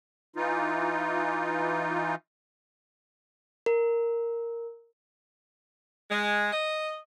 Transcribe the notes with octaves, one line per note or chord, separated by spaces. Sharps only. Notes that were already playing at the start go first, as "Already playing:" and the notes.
E3 D#4 F4
A#4
G#3
D#5